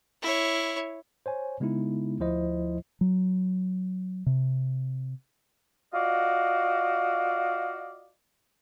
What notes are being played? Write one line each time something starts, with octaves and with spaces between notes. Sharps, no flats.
E4 C#5
C5 C#5 G#5
C#3 G#3 B3 D#4 E4
D2 F3 E4 C5 D#5
F#3
C3
F4 F#4 D5 D#5 F5